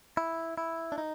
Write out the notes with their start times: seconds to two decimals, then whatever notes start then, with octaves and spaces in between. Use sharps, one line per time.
0.17 E4
0.58 E4
0.92 D4
0.98 D#4